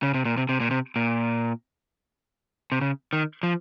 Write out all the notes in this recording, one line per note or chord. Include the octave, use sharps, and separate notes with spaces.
C#3
C3
A#2
C3
C3
A#2
C3
A#2
C3
C#3
D#3
F3